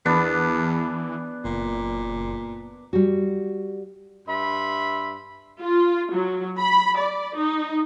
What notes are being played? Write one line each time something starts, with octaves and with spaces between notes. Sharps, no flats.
E2 E3 B3 D4 B4
F#1 A#2
G3 F#4
G2 E5 B5 C6
F4
F#3
B5
D5
D#4